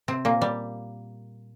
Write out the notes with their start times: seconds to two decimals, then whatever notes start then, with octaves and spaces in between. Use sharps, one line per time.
0.08 C3 C4
0.25 A#2 A#3
0.42 G3